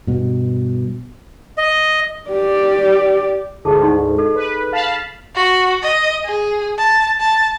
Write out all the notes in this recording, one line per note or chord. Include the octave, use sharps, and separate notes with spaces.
G2 B2
D#5
G4 D5
D2 G#2 G#4 A4 A5
D#4 C#6
A4 D#5
B4
F5 A5 B5
F#4
D#5
G#4
A5
A5